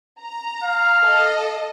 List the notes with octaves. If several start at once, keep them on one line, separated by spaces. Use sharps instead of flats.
A#5
F5
A4 D#5